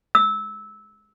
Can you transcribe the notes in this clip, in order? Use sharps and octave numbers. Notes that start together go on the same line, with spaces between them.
E6